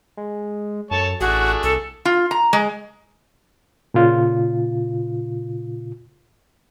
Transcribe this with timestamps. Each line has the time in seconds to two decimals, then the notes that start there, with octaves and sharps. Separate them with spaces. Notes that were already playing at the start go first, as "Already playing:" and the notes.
0.17 G#3
0.91 F#2 A4 C#5 A5
1.21 A1 A3 D4 F#4 G#4
1.63 C2 A4
2.05 F4
2.31 A#5
2.53 G#3
3.94 A#2 C#3 F4